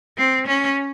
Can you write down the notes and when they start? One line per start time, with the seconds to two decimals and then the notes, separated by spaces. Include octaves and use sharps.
0.18 C4
0.48 C#4